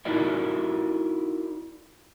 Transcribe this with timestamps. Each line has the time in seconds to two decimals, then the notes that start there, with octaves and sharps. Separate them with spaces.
0.05 D#4 E4 F#4 A#4 D5 E5